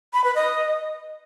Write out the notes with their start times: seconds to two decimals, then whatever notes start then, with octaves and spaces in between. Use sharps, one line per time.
0.13 B5
0.24 B4
0.35 D#5